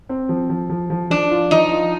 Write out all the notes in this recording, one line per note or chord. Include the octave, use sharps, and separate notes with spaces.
C4
F3
F3
F3
F3
F3 D4
F4
F3 D#4
F4